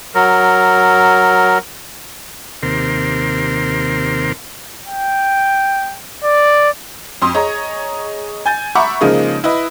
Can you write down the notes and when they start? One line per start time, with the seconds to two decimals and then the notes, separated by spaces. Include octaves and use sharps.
0.15 F#3 A#4
2.63 D#2 C3 A#4 C6
4.89 G5
6.24 D5
7.22 F2 C6 D#6
7.34 G#4 C#5 D#5 A#5
8.46 G#5 G6 A6
8.75 E5 F#5 A#5 B5 C#6 D6
9.01 C#3 F3 G#3 A#3 D#4
9.44 E4 B4 D#5